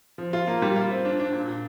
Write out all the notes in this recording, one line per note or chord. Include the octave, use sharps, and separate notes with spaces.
F3
F4
A#3
G3
F4
C4
D4
D4
A#2
A#2